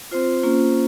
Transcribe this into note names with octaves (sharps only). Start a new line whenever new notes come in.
C4 F4 C5
A#3 C#4 F4